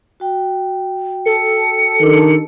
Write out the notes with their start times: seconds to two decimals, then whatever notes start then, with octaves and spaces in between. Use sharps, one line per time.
0.20 F#4 G5
1.26 A4 C#7
2.00 D#3 D4 G4